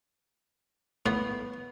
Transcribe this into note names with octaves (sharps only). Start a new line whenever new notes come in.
A2 B3